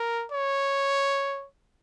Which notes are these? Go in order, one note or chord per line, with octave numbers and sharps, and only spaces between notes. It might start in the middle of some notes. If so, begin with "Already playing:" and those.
Already playing: A#4
C#5